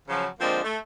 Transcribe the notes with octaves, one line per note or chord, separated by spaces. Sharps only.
C#3 F3 F#3
D3 F3 G#3 A#3 C4 D4
A3